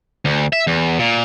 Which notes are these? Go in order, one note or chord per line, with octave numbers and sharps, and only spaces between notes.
D2
E5
E2
A#2